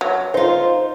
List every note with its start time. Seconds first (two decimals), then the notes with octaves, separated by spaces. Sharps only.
0.01 F#3
0.34 D#4 F4 C5